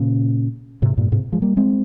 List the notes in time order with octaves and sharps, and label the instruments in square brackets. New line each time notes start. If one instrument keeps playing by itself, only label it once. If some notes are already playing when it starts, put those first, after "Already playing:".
Already playing: [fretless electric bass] A#2 C#3
G#2 C3
G2 A#2
G#2 C3
F3 G#3
G3 A#3
G#3 C4